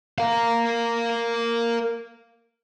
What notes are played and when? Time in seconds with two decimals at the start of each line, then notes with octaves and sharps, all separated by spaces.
0.18 A#4 F5